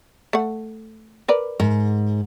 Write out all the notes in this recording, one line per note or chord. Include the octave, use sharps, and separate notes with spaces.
A3 F#5
A#4 B4 D5
G#2 A#4